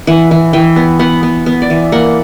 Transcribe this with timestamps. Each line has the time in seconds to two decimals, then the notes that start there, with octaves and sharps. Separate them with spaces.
0.07 E3 F#5
0.31 E3
0.53 E3 G5
0.76 B3
0.99 B3 F#5
1.23 B3
1.46 B3
1.62 D5
1.70 E3
1.92 A#3 F#5